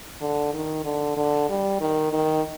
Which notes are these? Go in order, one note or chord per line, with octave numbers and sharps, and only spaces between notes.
D3
D#3
D3
D3
G3
D#3
D#3